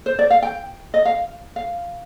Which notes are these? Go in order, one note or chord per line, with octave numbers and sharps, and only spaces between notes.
C5
D5
F5
G5
D#5
F5
F5